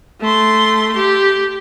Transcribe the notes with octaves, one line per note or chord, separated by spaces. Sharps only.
A3 C6
G4